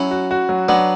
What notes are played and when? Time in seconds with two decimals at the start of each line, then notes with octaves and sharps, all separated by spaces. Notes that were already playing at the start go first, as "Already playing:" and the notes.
Already playing: F#3 C#4 E4
0.11 F#4
0.31 F#4
0.49 F#3
0.68 F#3 B3 D4